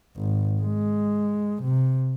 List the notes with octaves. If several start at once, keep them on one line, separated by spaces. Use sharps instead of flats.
G#1
G#3
C3